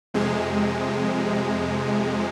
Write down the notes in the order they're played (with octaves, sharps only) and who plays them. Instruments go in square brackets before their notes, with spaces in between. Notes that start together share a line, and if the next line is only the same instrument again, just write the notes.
[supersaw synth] F2 C3 G#3